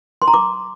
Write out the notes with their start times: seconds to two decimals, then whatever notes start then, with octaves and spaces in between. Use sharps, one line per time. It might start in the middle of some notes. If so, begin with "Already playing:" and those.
0.22 C6
0.28 A#5
0.34 D6